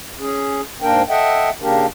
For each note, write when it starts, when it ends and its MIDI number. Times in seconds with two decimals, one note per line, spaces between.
0.19 0.61 61
0.19 0.61 68
0.82 1.02 44
0.82 1.02 58
0.82 1.02 62
0.82 1.02 70
0.82 1.02 79
1.09 1.50 69
1.09 1.50 75
1.09 1.50 76
1.09 1.50 78
1.09 1.50 79
1.61 1.86 49
1.61 1.86 58
1.61 1.86 62
1.61 1.86 67
1.61 1.86 70